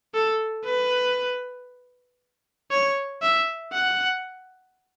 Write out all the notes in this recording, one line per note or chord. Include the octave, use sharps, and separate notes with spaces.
A4
B4
C#5
E5
F#5